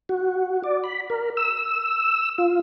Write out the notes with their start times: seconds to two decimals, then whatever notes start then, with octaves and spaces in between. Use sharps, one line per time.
0.09 F#4
0.64 D5
0.84 B5
1.10 A#4
1.37 E6
2.38 F4